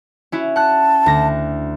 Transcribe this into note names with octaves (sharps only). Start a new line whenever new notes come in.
C#4 E4 F#4
F#5 A5 F#6
D2 A#6